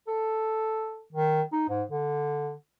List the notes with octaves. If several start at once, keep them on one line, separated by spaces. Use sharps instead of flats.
A4
D#3
D#4
G#2
D3